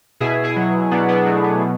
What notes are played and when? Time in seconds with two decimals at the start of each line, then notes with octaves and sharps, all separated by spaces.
0.20 B2 E4 G#4
0.44 E4 G#4
0.56 F#3
0.91 B2 B3 D4
1.08 B3 D4
1.26 F#3 A3
1.44 B3
1.62 B2